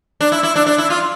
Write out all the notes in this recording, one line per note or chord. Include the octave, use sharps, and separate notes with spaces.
D4
E4
E4
D4
D4
E4
F4